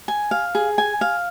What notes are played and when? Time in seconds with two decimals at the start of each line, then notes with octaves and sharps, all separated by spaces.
0.08 G#5
0.31 F5
0.55 G#4
0.78 G#5
1.01 F5